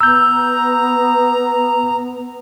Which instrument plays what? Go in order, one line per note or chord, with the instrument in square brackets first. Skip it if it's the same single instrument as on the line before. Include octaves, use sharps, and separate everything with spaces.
[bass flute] B3 [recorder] A#5 [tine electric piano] E6 G6